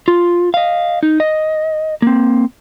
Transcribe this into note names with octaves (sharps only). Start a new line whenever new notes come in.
F4
D#5 F5
D#4
D#5
A#3 C4